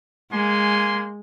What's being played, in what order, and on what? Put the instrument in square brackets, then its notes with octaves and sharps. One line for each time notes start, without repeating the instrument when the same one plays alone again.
[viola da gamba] G#3 [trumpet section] A#3 G#5 C6